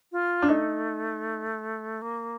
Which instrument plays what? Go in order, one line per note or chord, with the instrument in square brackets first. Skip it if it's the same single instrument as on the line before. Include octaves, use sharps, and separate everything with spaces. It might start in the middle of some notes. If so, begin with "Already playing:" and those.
[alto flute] F4
[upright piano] D4
[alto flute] A3 [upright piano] D#4
[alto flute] A#3